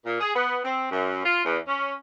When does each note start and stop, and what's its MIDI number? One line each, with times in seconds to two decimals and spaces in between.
0.06 0.20 46
0.20 0.34 68
0.35 0.60 59
0.65 0.89 60
0.91 1.24 42
1.25 1.44 65
1.45 1.59 40
1.67 1.93 61